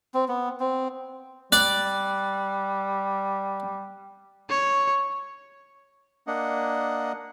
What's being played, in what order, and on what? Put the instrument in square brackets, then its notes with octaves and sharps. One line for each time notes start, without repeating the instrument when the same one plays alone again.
[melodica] C4
B3
C4
[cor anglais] G3 [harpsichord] D5 [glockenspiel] F#6
[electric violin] C#5
[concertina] A#3 D4 D#5 F#5